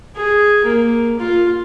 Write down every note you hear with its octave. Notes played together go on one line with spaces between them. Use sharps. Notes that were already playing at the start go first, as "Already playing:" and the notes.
G#4
A#3
F4